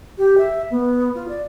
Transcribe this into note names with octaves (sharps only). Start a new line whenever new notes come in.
G4
E5
B3
F4
D5